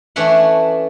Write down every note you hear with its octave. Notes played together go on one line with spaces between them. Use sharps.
E3 A3 C#4 D4 E5 F#5